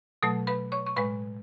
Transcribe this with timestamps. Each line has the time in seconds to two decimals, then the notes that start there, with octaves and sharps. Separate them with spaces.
0.23 B2 F#3 A3 A4 A5
0.47 B4 B5
0.72 C#5 C#6
0.86 C#6
0.96 A2 G#3 B4 B5